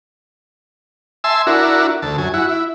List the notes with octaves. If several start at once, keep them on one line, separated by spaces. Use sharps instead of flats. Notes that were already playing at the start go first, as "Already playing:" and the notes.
E5 G#5 A5 C6 E6
D4 E4 F#4 A#4
D2 A5
F#2 G#5
E4 F#4
E4